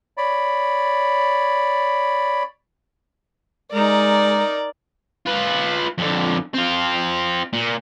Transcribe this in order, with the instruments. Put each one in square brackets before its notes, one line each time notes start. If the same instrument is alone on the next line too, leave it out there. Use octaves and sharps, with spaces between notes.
[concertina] C#5 D5 B5
[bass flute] G#3 [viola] D#4 A#4 [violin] D5
[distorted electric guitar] F4 B4
F2 D3
C4 F4
A#2